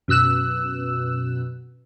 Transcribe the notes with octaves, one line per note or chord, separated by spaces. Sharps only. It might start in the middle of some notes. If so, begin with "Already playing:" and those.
F#2 B2 E6 F#6 E7